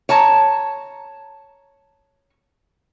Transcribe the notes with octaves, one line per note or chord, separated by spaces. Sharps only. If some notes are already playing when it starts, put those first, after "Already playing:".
C#5 A5 A#5